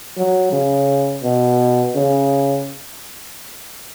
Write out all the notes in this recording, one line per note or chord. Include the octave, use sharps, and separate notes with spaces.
F#3
C#3
B2
C#3